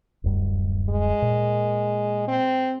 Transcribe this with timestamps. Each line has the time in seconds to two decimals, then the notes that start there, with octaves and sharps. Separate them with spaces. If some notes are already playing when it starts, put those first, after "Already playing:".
0.24 D1 F#2 G3
0.89 G#3
1.22 A#2
2.27 C4